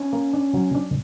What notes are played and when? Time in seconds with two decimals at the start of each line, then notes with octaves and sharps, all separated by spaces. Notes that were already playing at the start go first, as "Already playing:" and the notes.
Already playing: C#4
0.13 A#3
0.33 D4
0.54 F#3
0.75 D4